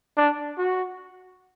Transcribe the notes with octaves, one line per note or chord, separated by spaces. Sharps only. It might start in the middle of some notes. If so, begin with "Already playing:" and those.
D4
F#4